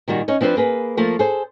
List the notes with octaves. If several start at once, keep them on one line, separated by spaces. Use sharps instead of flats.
A#2 D#3 G3 F#4
C#4 D#4 C#5
F3 C4 D4 F#4 B4 C5
A#3 G#4 B4
F3 A3 A#3
G#4 A4 C5